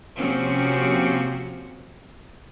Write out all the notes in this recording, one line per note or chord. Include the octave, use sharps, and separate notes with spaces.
C3 F3 A#3 C4 C#4 F#4